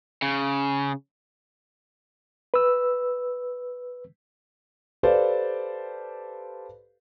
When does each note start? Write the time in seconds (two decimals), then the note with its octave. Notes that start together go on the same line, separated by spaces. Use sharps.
0.22 C#3
2.54 B4 E6
5.03 G4 A4 B4 C5 D5 F5